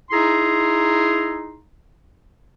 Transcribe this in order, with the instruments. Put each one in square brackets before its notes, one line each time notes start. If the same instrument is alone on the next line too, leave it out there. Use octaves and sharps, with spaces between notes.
[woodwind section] D#4 E4 G#4 A#5 C6